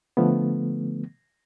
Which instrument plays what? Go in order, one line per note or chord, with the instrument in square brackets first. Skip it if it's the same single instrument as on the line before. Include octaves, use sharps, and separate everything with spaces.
[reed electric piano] D3 F3 A3 B3